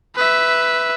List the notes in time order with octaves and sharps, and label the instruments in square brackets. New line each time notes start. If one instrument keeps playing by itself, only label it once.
[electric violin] B4 E5